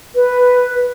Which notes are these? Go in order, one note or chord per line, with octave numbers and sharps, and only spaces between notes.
B4